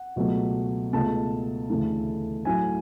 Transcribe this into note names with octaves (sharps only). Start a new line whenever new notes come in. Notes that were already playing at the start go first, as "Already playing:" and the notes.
Already playing: F#5
C#2 B2 F#3 A3
C#2 B2 A3 A5
D2 C#3 E3 A3
A2 F#3 A3 G#5